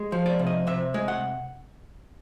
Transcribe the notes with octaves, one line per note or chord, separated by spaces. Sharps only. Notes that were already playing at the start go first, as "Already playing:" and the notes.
Already playing: G#3
F3
D5
C3
D#5
C3 E5
G#3
F#5